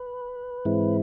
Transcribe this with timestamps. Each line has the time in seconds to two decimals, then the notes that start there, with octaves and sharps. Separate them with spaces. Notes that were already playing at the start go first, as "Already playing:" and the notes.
Already playing: B4
0.65 G#2 E3 G#3 C4 E4